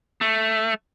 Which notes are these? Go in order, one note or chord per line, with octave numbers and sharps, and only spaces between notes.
A3